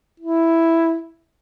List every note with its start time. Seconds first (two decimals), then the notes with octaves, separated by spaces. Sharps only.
0.20 E4